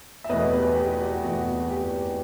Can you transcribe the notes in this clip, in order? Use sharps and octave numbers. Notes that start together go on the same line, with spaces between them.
E5
E2 B2 A3 B4 D#5
G4 B4
G4
F#4
E2 B2 A3 F#4
G4